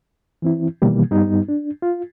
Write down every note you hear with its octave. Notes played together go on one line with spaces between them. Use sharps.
E3 C4 E4
B2 D#3 E3 G3 A#3
G2 G3 B3 D#4
D4
F4